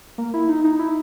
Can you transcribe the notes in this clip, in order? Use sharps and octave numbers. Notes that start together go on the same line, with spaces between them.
A#3
E4
D#4
D#4
E4